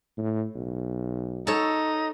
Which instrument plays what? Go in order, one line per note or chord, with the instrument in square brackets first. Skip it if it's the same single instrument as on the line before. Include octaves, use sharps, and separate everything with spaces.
[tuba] A2
B1
[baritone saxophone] D#4 [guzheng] A4 C#5